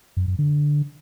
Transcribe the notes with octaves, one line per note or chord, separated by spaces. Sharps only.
F#2
F#2
D3